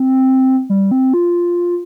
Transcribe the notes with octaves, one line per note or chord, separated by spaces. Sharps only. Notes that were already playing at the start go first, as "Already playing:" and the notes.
Already playing: C4
G3
C4
F4